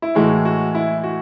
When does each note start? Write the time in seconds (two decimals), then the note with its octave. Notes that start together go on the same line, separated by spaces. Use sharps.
0.02 E4
0.15 A2 E3 G#3 F#4
0.45 F#4
0.75 E4
1.04 F#4